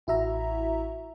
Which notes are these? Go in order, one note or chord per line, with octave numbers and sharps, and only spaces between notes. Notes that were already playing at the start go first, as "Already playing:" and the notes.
A1 E4 F#4 E5 A#5